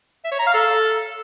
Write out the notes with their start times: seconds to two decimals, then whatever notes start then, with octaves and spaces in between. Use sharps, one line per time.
0.24 E5
0.32 C#5
0.39 A#5
0.47 F5
0.54 A4